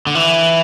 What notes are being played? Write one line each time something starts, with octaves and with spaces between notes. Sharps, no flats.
D3
E3